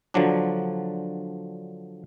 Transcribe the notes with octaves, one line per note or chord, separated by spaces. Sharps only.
D3 F3 F#3 D4